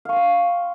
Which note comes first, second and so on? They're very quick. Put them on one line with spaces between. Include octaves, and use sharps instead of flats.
F5 C#6 C6 G5